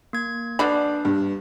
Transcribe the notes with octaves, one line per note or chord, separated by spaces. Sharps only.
A#3 G#6
D3 D4 F#4 B4 D5 B5
G2